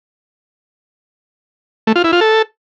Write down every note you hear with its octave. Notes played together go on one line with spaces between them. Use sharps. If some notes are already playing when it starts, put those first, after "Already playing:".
A3
F4
E4
F4
A4